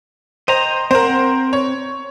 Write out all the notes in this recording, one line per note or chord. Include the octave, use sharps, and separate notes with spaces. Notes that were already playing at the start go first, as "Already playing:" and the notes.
C5 D#5 G5 A#5
C4 A#4 C5 F#5
C#5